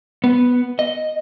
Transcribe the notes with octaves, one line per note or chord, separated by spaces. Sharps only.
B3
D#5